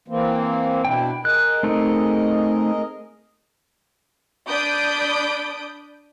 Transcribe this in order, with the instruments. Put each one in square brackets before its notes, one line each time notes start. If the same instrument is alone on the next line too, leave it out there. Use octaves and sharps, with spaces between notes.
[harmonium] E3 A#3 C4
[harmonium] B2 D4 E4 [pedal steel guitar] G5
[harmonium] G#4 A#4 D#5 [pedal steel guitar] F#6
[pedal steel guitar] A3 C4 D#4
[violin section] D4 B5 D#6 G6 D7